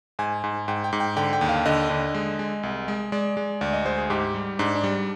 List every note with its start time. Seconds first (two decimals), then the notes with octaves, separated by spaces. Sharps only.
0.19 G#2 G#5
0.44 G#2
0.68 G#2 G5
0.84 G5
0.93 G#2
1.00 G5
1.17 D3 G5
1.33 G5
1.41 D#2
1.49 F5
1.66 D3 D#5
1.90 D3
2.14 G#3
2.39 G#3
2.63 C2
2.88 G#3
3.12 G#3 D5
3.37 G#3
3.61 D2 D5
3.73 D#5
3.85 G#3 C5
3.98 G#4
4.10 G#2 G4
4.34 G3
4.59 G#2 D4
4.75 D4
4.84 G3